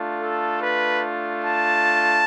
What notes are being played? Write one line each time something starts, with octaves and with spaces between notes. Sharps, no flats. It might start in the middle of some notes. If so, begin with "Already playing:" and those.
Already playing: A3 D4 F4
A4
B4
A5